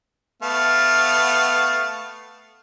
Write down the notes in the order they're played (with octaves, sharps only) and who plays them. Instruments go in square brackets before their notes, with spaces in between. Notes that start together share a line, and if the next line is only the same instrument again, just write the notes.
[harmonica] A3 B3 F5